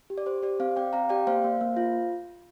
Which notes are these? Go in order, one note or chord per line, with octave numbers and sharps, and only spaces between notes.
G4
D5
G4 C5
G4 D5
C4 C5 F5
C4 D5 G5
C4 F5 A#5
G4 D5 G5
A#3 C5 F5
A#3
A#3
F4